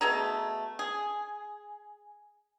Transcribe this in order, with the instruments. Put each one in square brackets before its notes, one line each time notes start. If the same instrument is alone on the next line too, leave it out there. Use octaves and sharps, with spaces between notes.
[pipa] B2 A3 G#4 A#5
G#4